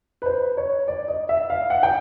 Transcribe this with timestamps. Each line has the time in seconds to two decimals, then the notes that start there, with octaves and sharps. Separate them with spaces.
0.22 B4
0.26 C5
0.57 C#5
0.88 D5
1.08 D#5
1.29 E5
1.50 F5
1.70 F#5
1.83 G5